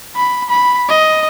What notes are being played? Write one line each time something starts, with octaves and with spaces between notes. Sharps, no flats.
B5
B5
D#5